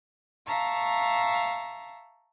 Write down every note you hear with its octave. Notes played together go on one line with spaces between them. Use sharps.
E5 F5 A5 A#5 C#6